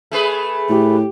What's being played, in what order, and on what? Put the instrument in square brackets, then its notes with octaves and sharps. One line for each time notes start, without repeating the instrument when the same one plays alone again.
[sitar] A3 G#4 B4
[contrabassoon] A2 [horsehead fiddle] G4